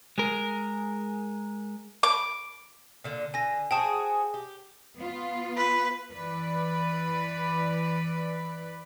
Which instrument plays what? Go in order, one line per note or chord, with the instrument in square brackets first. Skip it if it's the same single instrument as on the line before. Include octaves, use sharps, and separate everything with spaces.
[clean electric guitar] G#3 G#4 A#4
[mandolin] D6
[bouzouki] A#2 D3
[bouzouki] D3 [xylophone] G#5 A#6
[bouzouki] F#4 G#4 C5 [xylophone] G5 A5 E7
[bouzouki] G4
[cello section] B3 F4
[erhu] B4
[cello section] E3 B4 D5